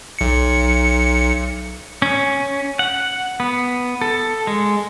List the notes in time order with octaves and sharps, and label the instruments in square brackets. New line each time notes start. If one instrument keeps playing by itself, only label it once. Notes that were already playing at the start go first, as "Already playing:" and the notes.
[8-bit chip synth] B1 C#7
[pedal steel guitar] C#4
F#5
B3
A4
G#3